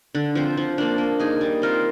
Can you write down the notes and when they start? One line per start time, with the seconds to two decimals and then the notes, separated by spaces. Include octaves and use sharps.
0.15 D3
0.35 F3 C4
0.57 F3
0.78 A#3 D4
0.98 A#3
1.19 D#4 G#4
1.41 G3
1.62 C4 F4 A#4